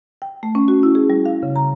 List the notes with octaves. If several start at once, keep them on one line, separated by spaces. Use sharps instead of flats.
G5
A3
C#4
F#4
E4
G#4
G3
F5
C#3
A#5